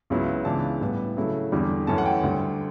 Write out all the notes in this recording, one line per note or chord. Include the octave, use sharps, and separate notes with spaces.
C#2 C#3 F#3 B3 E4
C#2 C#3 E3 B3 D4 A5
A2 G3 B3
C#3 F#3 A3 E4
E2 D3 G3
F#2 E3 A3 C#4 A5
F#5
G5
D2 D3 G3